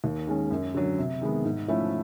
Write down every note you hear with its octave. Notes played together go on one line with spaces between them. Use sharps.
D#2
D#3 G#3 C#4
F#2
D3 F#3
C3
D#3 G#3 B3
G#2
F3 A3 C#4 E4